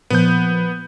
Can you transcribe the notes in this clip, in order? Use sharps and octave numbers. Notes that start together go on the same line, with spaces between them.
A#2 F3 B3 G6